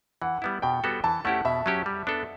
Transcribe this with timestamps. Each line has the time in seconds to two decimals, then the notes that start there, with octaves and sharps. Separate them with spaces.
0.22 E3 F#5
0.42 G3 B3 E4
0.62 B2 G5
0.84 G3 B3 F#4 A4
1.04 E3 A5
1.24 A3 C#4 E4 G4 F#5
1.45 B2 E5
1.66 F#3 C#4 G4
1.86 G3
2.07 B3 D4 A4